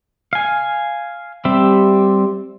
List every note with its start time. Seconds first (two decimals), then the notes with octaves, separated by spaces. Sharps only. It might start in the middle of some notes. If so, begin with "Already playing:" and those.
0.33 F5 G#5
1.45 G3 C4 G4 E5